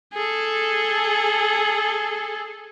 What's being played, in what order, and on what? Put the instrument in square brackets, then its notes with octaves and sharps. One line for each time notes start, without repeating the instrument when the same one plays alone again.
[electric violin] G#4 A4